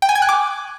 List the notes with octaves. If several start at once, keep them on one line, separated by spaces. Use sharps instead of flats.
G5
G#5
G#6
F#6
D6